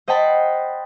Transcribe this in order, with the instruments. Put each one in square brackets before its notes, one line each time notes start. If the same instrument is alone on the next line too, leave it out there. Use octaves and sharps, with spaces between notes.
[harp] C5 D#5 F#5 G5 A5 B5